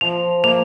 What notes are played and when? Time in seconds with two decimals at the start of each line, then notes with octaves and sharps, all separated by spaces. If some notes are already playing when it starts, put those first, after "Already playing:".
0.01 F3 F7
0.44 A#3 F7